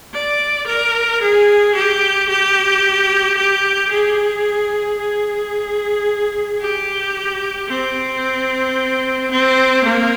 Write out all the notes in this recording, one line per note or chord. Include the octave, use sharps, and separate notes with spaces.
D5
A#4
G#4
G4
G4
G4
G#4
G#4
G4
C4
C4
A#3